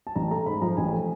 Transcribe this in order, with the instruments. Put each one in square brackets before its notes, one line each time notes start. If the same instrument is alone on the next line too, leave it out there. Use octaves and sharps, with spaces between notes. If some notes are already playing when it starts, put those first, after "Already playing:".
[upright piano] A5
A1 A#5
A3 A#5
G#2 B5
F3 A#5
A1 G#5
A3